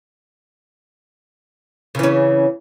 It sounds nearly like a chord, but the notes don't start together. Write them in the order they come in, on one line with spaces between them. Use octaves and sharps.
C#3 E3 C#4